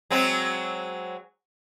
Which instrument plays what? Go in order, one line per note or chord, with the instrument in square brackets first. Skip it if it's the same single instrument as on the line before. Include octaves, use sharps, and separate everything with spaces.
[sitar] F#3 G#3 C4